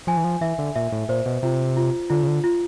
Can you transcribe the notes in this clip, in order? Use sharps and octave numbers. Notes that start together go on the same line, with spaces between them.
F3 G#5
E3
F3
E3 E5
D3
A#2 E5
A2
A#2 C5
B2
C3 F4
F4
D3 F4
C#3
D3
F4